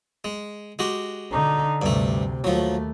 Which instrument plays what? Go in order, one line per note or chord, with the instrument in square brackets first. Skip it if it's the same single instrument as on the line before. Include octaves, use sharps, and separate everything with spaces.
[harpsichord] G#3
G#3 F#4 G4
[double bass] D3 D#4
[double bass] D2 C3 [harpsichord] G2 A3
[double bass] D#2 A3 [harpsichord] F3 F#3